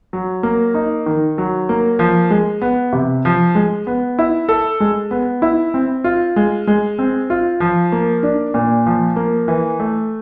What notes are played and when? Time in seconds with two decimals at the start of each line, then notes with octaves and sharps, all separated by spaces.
0.13 F#3
0.43 A#3
0.74 D#4
1.06 D#3
1.38 F#3
1.69 A#3
1.99 F3
2.30 G#3
2.61 B3
2.93 C3
3.25 F3
3.55 G#3
3.87 B3
4.19 E4
4.49 A4
4.80 G#3
5.11 B3
5.42 E4
5.74 C4
6.04 F4
6.36 G#3
6.67 G#3
6.99 C4
7.30 F4
7.60 F3
7.92 A#3
8.23 D4
8.54 A#2
8.86 F3
9.16 A#3
9.48 E3
9.80 A3